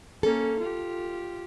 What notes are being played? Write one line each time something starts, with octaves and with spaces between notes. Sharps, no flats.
A#3 C#4 A4
F4 G4